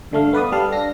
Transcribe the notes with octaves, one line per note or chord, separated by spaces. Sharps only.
G2 D3 A3 F5
B3 B4 D5 D#6
G3 A4 F5
D4 A#6